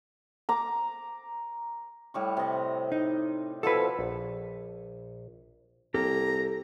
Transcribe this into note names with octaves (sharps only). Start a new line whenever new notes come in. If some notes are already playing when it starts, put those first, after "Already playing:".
A#5 D6
A2 G3 C#6
C3 D#5
D#4
B2 F3 E4 A4 B4
A#1
C2 A#3 G4 A4 A#5